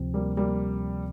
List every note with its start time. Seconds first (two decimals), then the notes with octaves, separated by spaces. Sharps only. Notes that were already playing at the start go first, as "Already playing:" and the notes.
Already playing: D2 C3 F3 C4
0.14 G3 A#3
0.37 G3 A#3